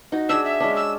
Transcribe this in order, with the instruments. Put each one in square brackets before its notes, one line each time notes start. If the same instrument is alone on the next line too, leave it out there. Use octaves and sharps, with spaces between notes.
[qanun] D#4 F#4
[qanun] D4 G#4 [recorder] E6
[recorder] E5
[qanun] G#3 C#4 D4
[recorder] E6